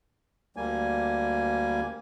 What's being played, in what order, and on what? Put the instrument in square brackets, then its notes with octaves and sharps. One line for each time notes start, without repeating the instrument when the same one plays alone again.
[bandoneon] D2 G3 A#3 G#5